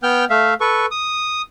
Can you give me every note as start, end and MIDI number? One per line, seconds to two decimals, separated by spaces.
0.03 0.25 59
0.03 0.25 79
0.03 0.25 89
0.03 0.25 91
0.30 0.54 57
0.30 0.54 76
0.30 0.54 77
0.61 0.86 69
0.61 0.86 71
0.61 0.86 85
0.91 1.42 87